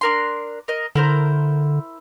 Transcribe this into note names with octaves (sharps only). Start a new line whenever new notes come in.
D4 A#4 C6
A#4 D#5
D3 E4 A#4 C5